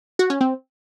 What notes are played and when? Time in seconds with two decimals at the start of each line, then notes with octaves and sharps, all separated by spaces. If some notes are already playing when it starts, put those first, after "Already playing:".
0.19 F#4
0.30 C#4
0.41 C4